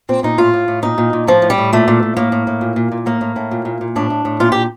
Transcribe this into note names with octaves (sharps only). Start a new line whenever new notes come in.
A#2 C4
A#2 D#4
A2 F4
A2
A2
A#2 D#4
A#2
A#2
A2 F3
A2
G3
A2
A#2 A3
A#2
A#2
A2 A#3
A2
A2
A#2
A#2
A#2
A2 A#3
A2
A2
A#2
A#2
A#2
A2 D4
A2
A2
A#2 F4
A#2 G4